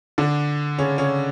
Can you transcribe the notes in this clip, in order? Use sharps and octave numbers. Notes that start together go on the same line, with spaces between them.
D3 D4
C#3 C#4
C#3 C#4